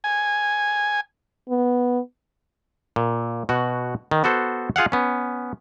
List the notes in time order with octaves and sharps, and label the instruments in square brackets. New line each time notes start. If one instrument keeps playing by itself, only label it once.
[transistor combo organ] G#5
[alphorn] B3
[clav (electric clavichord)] A#2
B2 F#4 F#5
D#3
B3 F#4 A4 C5
F4 G#4 F5 F#5
B3 C#4